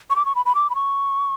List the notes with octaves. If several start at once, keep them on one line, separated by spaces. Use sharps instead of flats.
C#6
D6
C#6
B5
B5
D6
B5
C#6